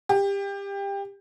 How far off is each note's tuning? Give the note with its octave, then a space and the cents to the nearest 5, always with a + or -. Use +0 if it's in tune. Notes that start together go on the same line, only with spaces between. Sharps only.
G4 +20